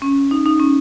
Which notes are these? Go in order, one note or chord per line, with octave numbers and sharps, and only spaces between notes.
C#4
D#4
D#4
C#4